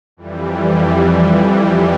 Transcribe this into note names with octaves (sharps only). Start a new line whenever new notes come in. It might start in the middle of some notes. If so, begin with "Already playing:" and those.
F2 E3 G3